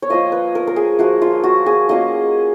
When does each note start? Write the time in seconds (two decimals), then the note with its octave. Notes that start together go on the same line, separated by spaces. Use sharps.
0.02 C#5
0.10 F3 A#3 F4 D#5
0.32 B4
0.55 A#4
0.67 A#4
0.76 G#4
0.99 F3 A#3 F4 F#4
1.22 F4
1.44 F#4
1.66 G#4
1.89 F#3 A#3 C#4 F4 D#5